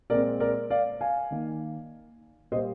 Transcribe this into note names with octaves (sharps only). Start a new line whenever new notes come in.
A#2 G#3 C4 A#4 D5
A#4 D5
D5 F5
F5 G#5
D#3 A#3
A#2 G3 A#3 C5 D#5